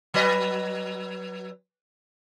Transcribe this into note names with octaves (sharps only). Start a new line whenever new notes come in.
F#3 B4 D#5